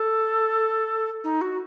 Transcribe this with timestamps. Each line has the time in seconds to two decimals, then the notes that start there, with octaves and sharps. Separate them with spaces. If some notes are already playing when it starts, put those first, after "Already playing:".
Already playing: A4
1.24 D#4
1.41 F#4